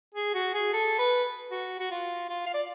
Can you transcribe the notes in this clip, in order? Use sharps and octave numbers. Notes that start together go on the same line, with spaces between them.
G#4
F#4
G#4
A4
B4
F#4
F#4
F4
F4
F5
D5